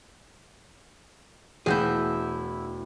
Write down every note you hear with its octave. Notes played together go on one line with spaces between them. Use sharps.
E1 A3 E4 F#4 G#4 G6